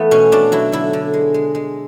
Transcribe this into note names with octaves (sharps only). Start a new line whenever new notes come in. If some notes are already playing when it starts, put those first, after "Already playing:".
Already playing: E3 A3 B3
B2 C#4
B2 D4
F#3 E4
D3 E4
D3
G#3
G#3
G#3